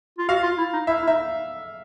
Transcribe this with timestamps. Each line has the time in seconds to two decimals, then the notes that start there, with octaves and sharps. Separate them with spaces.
0.18 F4
0.29 F#4 F5
0.43 F4
0.58 E4
0.73 D#4
0.87 E4 E5
1.03 E4
1.07 D#4 E5